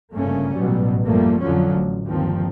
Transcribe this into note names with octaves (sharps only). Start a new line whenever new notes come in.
G1 G2 C#3 A3 A#3 C#4
A1 G#2 B2 F#3 G3
F#2 F3 G3 A3 A#3
F2 D3 F3 F#3 C#4
A1 D2
G1 D#2 D#3 F3 C4